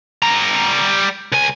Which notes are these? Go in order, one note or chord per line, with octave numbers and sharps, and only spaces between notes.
G3 A#5
C#2 G#5